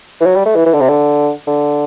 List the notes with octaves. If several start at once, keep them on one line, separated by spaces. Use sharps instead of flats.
E3
F#3
G3
A3
E3
E3
D3
C3
D3
D3